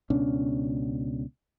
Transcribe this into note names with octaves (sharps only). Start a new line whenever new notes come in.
C#2 B2 C#4 D4